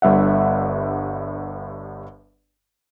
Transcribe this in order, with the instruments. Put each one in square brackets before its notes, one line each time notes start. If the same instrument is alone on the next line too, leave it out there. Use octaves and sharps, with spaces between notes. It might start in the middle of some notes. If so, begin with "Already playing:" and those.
[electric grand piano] G1 G2 E5 F#5